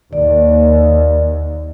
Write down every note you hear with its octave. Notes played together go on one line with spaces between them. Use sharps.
D#2 D5